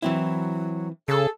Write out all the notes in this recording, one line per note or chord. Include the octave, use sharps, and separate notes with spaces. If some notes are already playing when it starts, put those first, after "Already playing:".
E3 F#3 C4 E4
C#3 G#4 A4